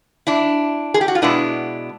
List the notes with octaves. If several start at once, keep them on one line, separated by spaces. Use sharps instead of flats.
D4 E4
G#4
G4
F#4
F4
B2 G#3 B3 D4 E4